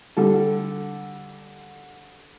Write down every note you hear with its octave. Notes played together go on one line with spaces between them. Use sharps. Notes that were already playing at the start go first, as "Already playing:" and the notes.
D3 G3 A4